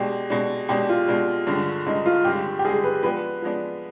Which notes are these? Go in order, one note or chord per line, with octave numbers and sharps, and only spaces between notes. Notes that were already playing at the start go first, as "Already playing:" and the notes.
Already playing: B2 G#3 D4 G4
B2 G#3 D4
B2 G#3 D4 G4
F4
B2 G#3 D4
G2 D3 G#3
G2 D3 G#3 D#4
F4
G2 D3 G#3 G4
G4
G2 D3 G#3 G#4
B4
F3 G#3 B3 D4 B4
F3 G#3 B3 D4